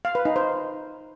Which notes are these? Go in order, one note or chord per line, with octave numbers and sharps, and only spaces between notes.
F5
B4
D#4
C5